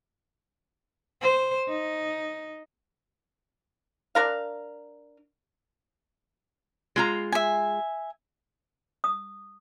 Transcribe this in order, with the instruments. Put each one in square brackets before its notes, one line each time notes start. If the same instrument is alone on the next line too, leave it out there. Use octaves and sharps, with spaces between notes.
[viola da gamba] C5
D#4
[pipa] D4 A#4 F5
[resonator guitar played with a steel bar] G#3 F4 A#5
[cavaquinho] E5 G#5
[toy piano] D#6